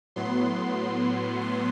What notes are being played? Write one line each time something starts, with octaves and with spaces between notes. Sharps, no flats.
A2 F#3 B3 C6
C6